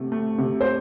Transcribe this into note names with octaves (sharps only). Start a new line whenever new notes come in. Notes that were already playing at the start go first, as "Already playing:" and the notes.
Already playing: C3 A3
A3
C3
C5